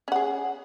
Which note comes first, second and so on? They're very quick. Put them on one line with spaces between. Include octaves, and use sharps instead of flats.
C#4 F#5 G#4